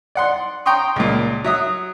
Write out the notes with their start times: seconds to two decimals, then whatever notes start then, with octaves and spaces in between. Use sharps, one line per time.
0.15 D5 F#5 C6
0.66 G5 A#5 C6 C#6 D#6
0.96 C#2 A#2
1.44 F#3 E5 D#6